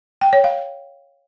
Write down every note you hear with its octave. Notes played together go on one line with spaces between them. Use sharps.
G5
C#5
F5